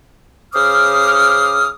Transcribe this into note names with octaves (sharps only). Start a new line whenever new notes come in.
C#3 C5 D6 D#6 F6